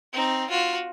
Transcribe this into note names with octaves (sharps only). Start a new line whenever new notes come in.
C4 D#4
F4 F#4